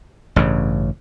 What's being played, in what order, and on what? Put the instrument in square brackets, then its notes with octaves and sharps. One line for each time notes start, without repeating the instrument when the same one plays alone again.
[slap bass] A1 G2 C#3